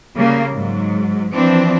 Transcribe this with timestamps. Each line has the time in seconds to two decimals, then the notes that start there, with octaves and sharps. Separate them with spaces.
0.15 C#3 G3 A#3
0.54 G#2 F#3
1.33 E3 F3 C4 D4